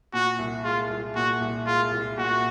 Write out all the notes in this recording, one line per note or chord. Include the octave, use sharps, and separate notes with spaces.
A#2 F#4
C2
G#3 F4
C2
A#2 F#4
C2
G#3 F4
C2
A#2 F#4